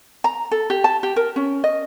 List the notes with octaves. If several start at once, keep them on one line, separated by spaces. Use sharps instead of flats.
A#5
A4
G4
A5
G4
A#4
C#4
D#5